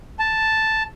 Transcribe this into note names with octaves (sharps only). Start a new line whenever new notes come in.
A5